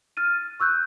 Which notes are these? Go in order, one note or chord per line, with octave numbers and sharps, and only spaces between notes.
F6 A6 D#7
C#6 E6 F#6 G6